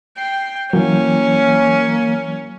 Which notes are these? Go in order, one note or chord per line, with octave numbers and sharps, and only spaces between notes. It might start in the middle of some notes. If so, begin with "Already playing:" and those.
G5 C7
E3 F#3 A#3 C#4